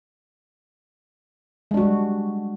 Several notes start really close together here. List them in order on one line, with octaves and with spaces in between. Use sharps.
G#3 D4 F#4 G3